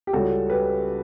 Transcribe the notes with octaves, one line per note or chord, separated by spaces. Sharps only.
G4
C#2 C#3 G3 C#4 F#4 A4
G4 B4